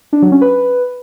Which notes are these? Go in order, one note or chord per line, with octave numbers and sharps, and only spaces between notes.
D4
F#3
C#4
B4